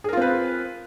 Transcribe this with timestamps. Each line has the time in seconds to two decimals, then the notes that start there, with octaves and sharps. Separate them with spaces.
0.04 G#4
0.09 A#4
0.13 F4
0.17 C4
0.21 B4